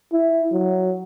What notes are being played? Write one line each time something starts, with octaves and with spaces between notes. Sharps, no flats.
E4
F#3